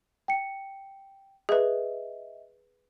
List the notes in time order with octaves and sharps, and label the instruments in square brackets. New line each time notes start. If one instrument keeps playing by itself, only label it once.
[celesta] G5 C#7
[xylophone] G#4 B4 [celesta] D#5 E5